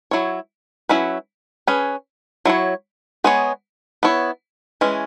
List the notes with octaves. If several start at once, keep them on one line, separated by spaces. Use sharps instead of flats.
F#3 E4 C#5
F#3 C#4 E4 B4
C#4 G#4 B4
F#3 E4 C#5
G#3 B3 G#4 C#5
B3 E4 C#5
E3 G#3 C#4